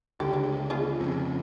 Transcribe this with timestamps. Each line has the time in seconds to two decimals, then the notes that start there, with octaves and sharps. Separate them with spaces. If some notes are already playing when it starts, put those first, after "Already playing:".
0.20 C#2 D3 G4
0.33 G#3
0.70 B3 F4 G#4
0.99 F2 C#3